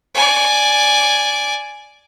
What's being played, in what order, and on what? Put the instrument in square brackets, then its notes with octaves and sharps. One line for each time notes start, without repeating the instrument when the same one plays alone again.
[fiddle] D5 G#5